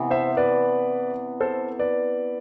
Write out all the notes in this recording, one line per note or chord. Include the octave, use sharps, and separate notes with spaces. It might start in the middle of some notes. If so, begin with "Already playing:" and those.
Already playing: C3 E3 B3
C5 E5
B4 D5
A4 C5
B4 D5